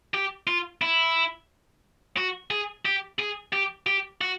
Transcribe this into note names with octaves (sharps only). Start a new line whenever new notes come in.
G4
F4
E4
F#4
G#4
G4
G#4
G4
G4
F#4